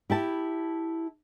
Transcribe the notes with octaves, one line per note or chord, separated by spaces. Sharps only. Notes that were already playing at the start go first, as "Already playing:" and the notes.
E4 G4 A5